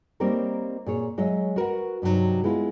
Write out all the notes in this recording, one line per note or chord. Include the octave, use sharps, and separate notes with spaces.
G3 A#3 C4 D#4 A#4 C#5
A#2 G#4 C#5
F#3 G#3 C#5 D#5 E5
F#4 A#4 B4 F#5
G2 C3 F3 F#3 D#4
G#3 B3 E4 F4